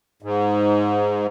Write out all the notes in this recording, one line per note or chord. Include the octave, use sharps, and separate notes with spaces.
G#2